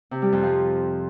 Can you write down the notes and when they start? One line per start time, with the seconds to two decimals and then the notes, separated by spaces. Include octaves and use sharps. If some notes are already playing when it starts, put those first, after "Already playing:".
0.11 C3
0.22 G3
0.32 F2
0.43 F3